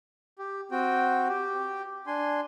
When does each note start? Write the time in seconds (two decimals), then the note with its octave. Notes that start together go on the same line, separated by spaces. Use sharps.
0.39 G4
0.71 C4 F#4 G5
1.29 G4
2.07 D4 G#5 C6